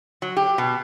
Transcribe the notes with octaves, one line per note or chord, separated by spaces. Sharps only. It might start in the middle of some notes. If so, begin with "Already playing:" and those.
F#3
G4
B2